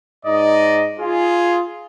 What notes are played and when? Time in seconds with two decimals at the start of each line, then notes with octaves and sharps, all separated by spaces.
0.26 G#2 D#4 D5 D#5
0.99 F4 G#4